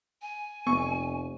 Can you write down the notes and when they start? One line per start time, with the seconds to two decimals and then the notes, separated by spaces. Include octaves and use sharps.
0.22 G#5
0.67 F1 B3 C#6